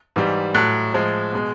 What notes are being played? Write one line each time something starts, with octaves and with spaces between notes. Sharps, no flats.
G#2 E3 G3
A2 F#3 F#6
A2 F3 G#3
B2 G#3